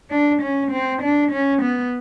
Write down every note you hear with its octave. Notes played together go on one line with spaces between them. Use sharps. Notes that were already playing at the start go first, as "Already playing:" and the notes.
D4
C#4
C4
D4
C#4
B3